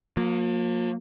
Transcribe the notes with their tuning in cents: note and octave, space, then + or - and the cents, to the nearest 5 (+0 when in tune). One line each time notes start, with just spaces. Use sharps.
F3 +45 A#3 +0